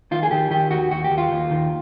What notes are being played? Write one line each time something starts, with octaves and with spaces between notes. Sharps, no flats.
D#3 F4
G#4
D#3 G4
D#3 G4
D#2 F#4
D#2 F#4
G4
D#2
F4
D#2
D#3